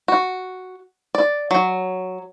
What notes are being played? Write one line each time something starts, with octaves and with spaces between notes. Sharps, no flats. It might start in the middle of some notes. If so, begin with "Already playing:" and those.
F#4
D5
F#3